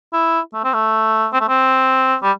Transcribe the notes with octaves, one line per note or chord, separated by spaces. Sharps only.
E4
A3
C4
A3
C4
A3
C4
G3